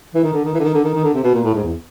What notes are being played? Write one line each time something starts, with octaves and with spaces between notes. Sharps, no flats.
E3
D#3
D3
D#3
E3
D3
D#3
D3
D#3
D#3
D3
C3
B2
A#2
A2
G#2
E2